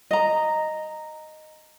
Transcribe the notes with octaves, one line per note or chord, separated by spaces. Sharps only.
D#5 A#5